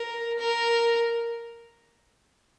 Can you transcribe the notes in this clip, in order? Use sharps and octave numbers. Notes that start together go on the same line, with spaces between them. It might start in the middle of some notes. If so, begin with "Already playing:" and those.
Already playing: A#4
A#4